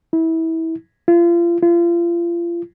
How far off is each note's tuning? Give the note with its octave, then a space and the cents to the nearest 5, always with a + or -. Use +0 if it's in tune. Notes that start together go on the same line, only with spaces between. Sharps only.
E4 -25
F4 -35
F4 -35